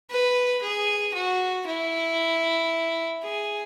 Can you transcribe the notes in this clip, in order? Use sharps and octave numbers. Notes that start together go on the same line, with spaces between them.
B4
G#4
F#4
E4
G#4